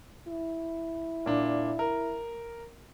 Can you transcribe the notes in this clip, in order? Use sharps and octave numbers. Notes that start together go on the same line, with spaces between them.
E4
A#2 D4
A#4